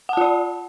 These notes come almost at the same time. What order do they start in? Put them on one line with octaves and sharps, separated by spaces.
F#5 A5 F4 D5